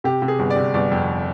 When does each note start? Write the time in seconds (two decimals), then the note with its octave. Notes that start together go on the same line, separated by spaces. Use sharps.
0.04 C3 G4
0.22 C3
0.28 G#4
0.39 G1
0.50 D5
0.56 C3
0.74 G1 D5
0.91 F2